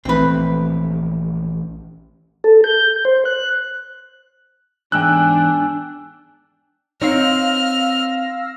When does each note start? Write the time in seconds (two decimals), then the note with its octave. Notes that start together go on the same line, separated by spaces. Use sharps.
0.05 A#1 E3 A3 C4 B4
2.44 A4
2.64 G6
3.05 C5
3.25 F#6
4.92 E2 G#2 D4 G5 G#5 E6 F#6
7.01 C4 D#4 C#5 F5 E6 F6 A#6